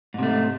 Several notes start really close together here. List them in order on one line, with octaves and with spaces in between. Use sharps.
G#2 C3 A3